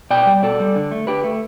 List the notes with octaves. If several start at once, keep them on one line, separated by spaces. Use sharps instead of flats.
B2 D5 G5
G3
B2 A4 D5
G3
D3
A3
D3 G4 B4
A3